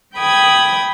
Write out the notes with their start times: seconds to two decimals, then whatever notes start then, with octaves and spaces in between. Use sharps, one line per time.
0.17 G5 B5 D#6 G#6